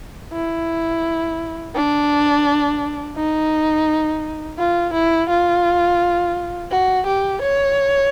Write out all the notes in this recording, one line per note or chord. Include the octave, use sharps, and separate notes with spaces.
E4
D4
D#4
F4
E4
F4
F#4
G4
C#5